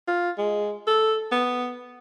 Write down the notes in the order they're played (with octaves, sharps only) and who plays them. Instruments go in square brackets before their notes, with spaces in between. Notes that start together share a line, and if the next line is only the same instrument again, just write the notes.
[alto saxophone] F4
G#3
A4
B3